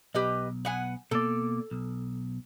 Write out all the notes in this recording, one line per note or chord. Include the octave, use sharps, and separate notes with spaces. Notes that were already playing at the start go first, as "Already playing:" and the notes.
B1 G4 B4 D#5
B3 F#5 G#5
B2 A#3 A4 D5
B1